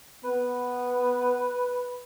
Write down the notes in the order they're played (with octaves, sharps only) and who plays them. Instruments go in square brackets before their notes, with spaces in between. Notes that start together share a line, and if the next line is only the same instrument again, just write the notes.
[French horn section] B3 [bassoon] B4